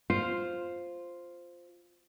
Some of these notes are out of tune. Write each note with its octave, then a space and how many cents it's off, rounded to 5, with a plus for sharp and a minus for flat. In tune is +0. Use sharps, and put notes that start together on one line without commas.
F4 +0 C5 +0